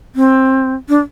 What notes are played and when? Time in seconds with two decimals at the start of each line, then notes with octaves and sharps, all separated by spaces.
0.16 C4
0.89 D4